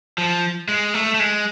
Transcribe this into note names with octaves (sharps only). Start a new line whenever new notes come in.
F3
G#3
A3
A3
G#3